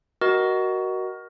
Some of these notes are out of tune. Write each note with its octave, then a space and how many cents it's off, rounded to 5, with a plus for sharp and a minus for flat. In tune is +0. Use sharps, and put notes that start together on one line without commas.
F#4 +15 A#4 +15 D#5 +0